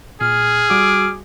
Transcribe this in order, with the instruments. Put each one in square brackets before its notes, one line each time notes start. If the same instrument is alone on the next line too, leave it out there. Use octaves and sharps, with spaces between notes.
[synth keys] A#2 [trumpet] G#4 [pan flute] F6
[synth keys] G3 F#4 [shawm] D6